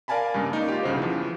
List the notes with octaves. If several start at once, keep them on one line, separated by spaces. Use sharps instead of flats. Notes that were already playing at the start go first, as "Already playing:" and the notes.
A#4 D5 F5 G#5 A5 B5
G2 C#3 G#3 A#3
A#3 D#4
F4 G4
B1 G2 C#3 F#4 C5
E3 F3